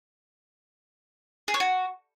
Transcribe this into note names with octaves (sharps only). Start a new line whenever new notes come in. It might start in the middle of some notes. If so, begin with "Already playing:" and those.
G#4
C#5
F#4